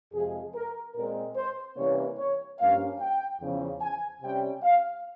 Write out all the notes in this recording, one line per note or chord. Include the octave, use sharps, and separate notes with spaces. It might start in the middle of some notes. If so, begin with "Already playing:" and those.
F2 C3 F3 G#3 G#4
A#4
A#2 G#3 C4 A#4
C5
C3 E3 G3 A#3 C#4 C#5
C#5
G2 F3 A#3 C#4 F5
G5
E2 C#3 F3
G#5
C3 G3 C#4 G5
F5